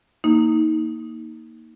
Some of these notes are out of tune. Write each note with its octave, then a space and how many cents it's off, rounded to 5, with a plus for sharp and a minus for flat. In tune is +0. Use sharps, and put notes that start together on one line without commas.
A#3 +0 D#4 +20